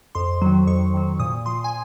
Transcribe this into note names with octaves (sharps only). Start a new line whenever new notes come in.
F2 C6
D#3 F#3
F2 C#6
D#3 F#3
A#2 D#6
F3 C6
G#5